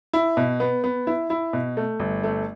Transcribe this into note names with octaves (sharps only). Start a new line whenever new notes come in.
E4
B2
B3
B3
E4
E4
B2
A3
G1
A3